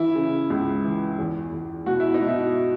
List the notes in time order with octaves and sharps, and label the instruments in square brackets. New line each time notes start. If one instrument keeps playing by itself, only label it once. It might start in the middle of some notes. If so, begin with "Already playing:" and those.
Already playing: [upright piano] E3 E4
C#3
C#2
E3
E2
E2
B2 F#4
E4
D#4
B2
E4